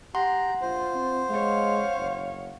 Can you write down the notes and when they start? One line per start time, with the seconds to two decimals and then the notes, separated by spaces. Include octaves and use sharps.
0.15 G4 F#5 A#5 C6
0.61 A#1 F4 C5
0.95 C4
1.30 G#3 C#5 F5
1.98 F#1